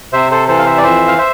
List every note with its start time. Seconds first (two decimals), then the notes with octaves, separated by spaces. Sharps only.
0.13 C3 C5 E5
0.31 A4 C5
0.48 E3 A4 C5
0.58 F5
0.65 C5 E5
0.78 D5
0.83 F2 C5 E5
1.07 F5
1.18 C5 E5